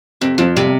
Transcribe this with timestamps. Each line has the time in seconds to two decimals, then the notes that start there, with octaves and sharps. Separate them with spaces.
0.21 F2 C3
0.38 F2 F3
0.56 C3 G3